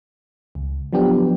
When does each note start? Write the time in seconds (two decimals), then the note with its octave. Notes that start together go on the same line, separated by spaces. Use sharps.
0.55 C#2
0.93 F3 F#3 B3 D4 G4